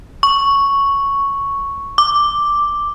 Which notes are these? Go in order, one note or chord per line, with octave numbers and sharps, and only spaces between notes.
C#6
D6